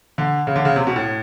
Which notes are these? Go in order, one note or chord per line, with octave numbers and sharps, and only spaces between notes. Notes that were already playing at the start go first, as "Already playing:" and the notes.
D3
C#3
D3
C#3
C3
B2
A2